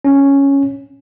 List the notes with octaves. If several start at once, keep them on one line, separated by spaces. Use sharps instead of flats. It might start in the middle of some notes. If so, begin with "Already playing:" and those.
C#4